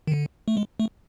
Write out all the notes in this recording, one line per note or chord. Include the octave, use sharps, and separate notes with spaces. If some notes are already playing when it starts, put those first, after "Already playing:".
D#3
D3
A3
G#3
A3